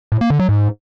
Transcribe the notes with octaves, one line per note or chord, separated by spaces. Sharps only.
A2
A#3
D3
F#3
G#2